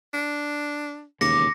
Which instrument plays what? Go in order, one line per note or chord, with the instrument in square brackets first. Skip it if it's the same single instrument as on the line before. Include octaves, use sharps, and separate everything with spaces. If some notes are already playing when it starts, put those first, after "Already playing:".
[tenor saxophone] D4
[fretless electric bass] E1 D#2 C#3 [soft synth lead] D6 [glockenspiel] A#6 C#7